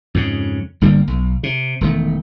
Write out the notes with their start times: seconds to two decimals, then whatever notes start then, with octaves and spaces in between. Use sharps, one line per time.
0.15 F2 G#2 C#3
0.81 G1 D3 G3 A#3
1.08 B1
1.43 C3
1.81 E1 D#3 A3